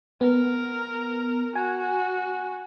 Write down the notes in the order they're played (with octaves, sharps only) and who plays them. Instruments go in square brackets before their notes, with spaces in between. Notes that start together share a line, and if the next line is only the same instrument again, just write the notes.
[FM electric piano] B3 [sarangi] A#4
[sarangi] F#4 [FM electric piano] G#5